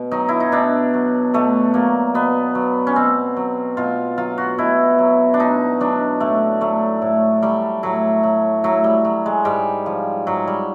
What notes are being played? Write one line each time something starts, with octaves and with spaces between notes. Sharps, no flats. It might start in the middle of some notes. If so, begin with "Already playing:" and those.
Already playing: B2
F#3 D#4
E4
D#4
B2 D4
F#3
B2 A3
F#3 A#3
B2 B3
F#3
C#4
B2 C4
F#3
B2 F4
F#3 F4
F#4
B2 E4
F#3
D4
B2 D#4
F#3 D4
A2 A3
F#3 A3
A2
F#3 G3
A2 F#3
F#3
A2 F#3
G3
F#3
G#3
G#2 G3
F3
G#2 F#3
G3